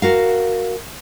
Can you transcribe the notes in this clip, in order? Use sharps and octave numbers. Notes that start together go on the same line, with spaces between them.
F#4 A#4 F5